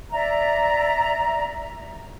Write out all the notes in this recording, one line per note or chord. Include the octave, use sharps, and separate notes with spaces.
D5 E5 A#5